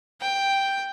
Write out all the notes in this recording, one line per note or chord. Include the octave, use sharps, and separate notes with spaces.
G5